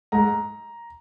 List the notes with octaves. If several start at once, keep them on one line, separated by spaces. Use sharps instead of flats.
G#2 A#5